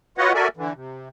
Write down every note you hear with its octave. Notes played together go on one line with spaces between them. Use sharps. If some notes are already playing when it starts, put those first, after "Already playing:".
F4 F#4 B4 C#5 D#5 F#5
F#4 A4 A#4 D5 E5 G#5
D3 E3
C3